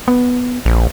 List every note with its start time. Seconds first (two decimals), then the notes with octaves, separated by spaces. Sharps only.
0.08 B3
0.65 A#1